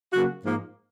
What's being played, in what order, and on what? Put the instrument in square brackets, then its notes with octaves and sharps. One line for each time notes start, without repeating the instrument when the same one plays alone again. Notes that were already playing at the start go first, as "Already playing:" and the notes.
[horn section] C#3 F#3 A#3 F#4
G#2 F3 A#3